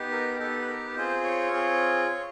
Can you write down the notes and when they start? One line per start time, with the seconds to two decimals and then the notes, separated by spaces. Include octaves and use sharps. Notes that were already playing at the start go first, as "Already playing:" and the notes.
Already playing: B3 D#4 G4
0.12 A#4
0.40 B3 D#4 G4 A4
0.62 B4
0.68 A#4
0.95 C4 F4 G#4 C5
1.24 C#5
1.51 C4 F4 G#4